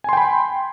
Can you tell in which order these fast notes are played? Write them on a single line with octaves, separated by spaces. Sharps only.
G#5 C6 G5 B5